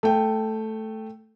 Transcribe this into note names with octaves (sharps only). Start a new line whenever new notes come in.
A3 G5